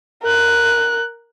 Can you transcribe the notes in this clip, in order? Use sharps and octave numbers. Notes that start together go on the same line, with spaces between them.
A#4 F#6